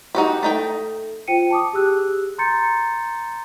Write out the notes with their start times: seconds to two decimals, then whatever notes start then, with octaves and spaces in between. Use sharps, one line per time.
0.15 D#4 F#4 G4
0.43 A3 D#4 G5
1.27 F4 C5 G5 C#7 D#7
1.51 A5 D6 D#6
1.73 G4 G#4 E6 F#6
2.38 A#5 C6 G6 A6 C#7